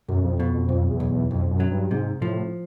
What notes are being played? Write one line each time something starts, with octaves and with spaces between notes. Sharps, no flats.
B1 F#2
F2
F2 B2
F2
B1 F2
E2
B1
E2
B1 F2
F#2
F#3
G2
G#2 C3
A2 F3